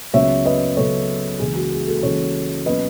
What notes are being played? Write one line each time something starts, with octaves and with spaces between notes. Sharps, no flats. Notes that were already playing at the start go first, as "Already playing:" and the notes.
C#2 C#3 F#3 B3 C#5 E5
B4 D#5
C#2 C#3 F#3 B3 A4 C#5
C#2 C#3 E3 G#3 G#4
F#4
G#4
F#4 A4
C#2 C#3 E3 G#3 A4 C#5
B2 F#3 C#4 B4 D#5